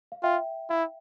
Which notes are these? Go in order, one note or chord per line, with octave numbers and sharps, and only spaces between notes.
F5
F4 E5 G5
E4 F5